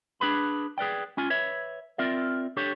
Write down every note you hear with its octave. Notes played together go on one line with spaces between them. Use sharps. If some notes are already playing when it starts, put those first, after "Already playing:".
D4 G#4 B4 B5
G#4 B4 D5 G5
C#4 F4 G#5
B4 C#5 E5
C4 F4 A#4 D5 E5
D4 G4 A4 C#5